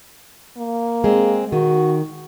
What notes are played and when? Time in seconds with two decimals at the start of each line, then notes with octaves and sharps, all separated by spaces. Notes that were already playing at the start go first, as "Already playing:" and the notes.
0.57 A#3
1.04 G#3 C4
1.52 D#3 F#4